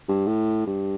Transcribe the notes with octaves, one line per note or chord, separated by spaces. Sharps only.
G2
A2
G2